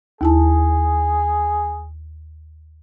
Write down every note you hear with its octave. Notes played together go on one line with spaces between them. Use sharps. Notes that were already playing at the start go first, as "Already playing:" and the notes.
D#2 E4 G#4 A5